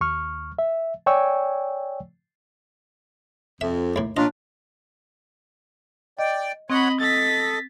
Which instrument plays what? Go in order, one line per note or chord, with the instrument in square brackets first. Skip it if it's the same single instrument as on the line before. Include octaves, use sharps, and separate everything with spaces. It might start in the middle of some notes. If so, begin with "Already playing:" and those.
[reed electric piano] D#2 C#6 F6
E5
C#5 D5 G5 G#5 C#6 E6
[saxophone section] F2 [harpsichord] E5
[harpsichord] D#2 A2
[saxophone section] A#2 C#4 F4 [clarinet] D4 [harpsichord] D#5
[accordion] D5 G5 [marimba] D#5
[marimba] C4 [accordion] C#5 F#5 [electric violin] D#5 B5
[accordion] A4 D#5 [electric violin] A6 B6